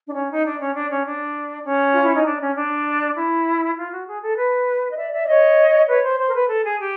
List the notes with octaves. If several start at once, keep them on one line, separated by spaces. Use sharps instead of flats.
D4
C#4
D#4
D4
C#4
D4
C#4
D4
C#4
F4
E4
D#4
D4
C#4
D4
E4
F4
F#4
G#4
A4
B4
D#5
D5 E5
D5 E5
D5
C#5 D#5
B4 C#5
C5
C5
A#4
B4
A4
G#4
G4